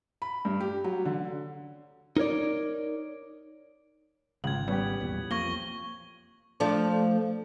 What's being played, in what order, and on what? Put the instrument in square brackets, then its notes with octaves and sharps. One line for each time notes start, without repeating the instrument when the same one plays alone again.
[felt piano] B5
G2
G4
F#3
D3
[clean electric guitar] D#4 A#4 C#5 D5
[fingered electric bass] G#1 [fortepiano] C#2 [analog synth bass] C#3 [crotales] G#6 F#7
[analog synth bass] G3 [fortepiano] B3 C#4 G4
[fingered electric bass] B1 E2 A#2
[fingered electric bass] F2 F3 [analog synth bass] A#3 [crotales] C#6 A#6 G7
[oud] F3 A3 D4